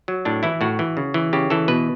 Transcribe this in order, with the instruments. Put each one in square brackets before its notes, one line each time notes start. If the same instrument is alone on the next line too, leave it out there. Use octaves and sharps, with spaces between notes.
[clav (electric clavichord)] F#3
A2 D4
E3 E4
A2 F#4
E3
C#3
E3
C#3 G4
E3 A4
B2 B4